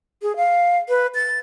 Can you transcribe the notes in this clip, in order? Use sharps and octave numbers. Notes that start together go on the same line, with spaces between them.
G#4
F5
B4
A6